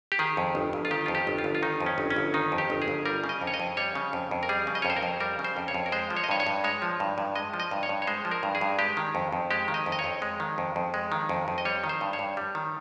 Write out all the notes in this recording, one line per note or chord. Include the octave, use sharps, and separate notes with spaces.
G4
D#3 G#4
F2
G1
G1
F4
D#3 G4
F2 F4
G4
G1
F4
G1
F4
D#3 D#4
F2
C#4
G1
C#4
G1
D#3 D#4
F2
G4
G1
G#4
G1
G3 A#4
C#3
D#5
F2
C#5
D#5
F2
G3 C#5
C#3
F2
F2
A#4
G3 G#4
C#3
D#5
F2 C#5
C5
A#4
F2
G3 A#4
C#3
C5
F2
C#5
F2
A#4
G#3 C5
F3
C#5
D#5
G2 C#5
C#5
G2
G#3 C#5
F3
G2
G2
G#3 D#5
F3
D#5
G2
C#5
G2
C#5
G#3 C5
F3
A#4
G2
G#4
G2
G#3 G4
D#3
F2
F2
G#3 G4
D#3
D#5
F2
D#5
C#5
F2
G#3
D#3
F2
F2
G#3
D#3
F2
F2
D#5
G3 C#5
D#3
C5
G2
C#5
G2
G3
D#3